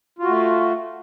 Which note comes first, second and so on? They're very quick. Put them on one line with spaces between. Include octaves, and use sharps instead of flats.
F4 F#4 A3